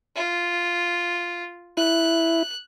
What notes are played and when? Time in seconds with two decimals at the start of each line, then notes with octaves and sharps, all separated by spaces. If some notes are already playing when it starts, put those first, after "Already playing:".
0.16 F4
1.77 E4 F#6